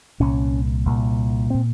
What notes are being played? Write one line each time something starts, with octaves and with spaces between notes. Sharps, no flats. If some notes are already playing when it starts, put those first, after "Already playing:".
C2 A#2 C#4
C2 A#2
A#2 C4